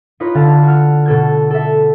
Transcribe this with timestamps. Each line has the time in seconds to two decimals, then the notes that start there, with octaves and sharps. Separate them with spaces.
0.20 D#4 F4 B4 C#5
0.34 D3 F5 A5
0.63 F#4 F6
1.06 B2 A4 G#6
1.51 A4 E5